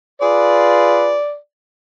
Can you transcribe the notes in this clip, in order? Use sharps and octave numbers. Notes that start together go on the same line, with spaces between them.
F4 G#4 B4 D5